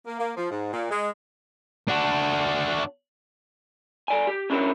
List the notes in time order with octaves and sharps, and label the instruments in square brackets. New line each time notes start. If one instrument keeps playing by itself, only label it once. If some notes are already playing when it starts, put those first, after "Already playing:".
[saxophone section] A#3
A#3
F3
G#2
A#2
G#3
[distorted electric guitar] D4 F#4
[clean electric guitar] A4 D5 G#5
G4
C#4 D4 E4 A#4 C#5